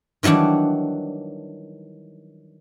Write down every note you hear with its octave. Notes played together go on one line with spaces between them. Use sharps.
D#3 E3 F#3 G3 D4